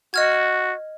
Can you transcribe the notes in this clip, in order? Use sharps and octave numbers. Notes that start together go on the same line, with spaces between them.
F#4 D#5 F6 G#6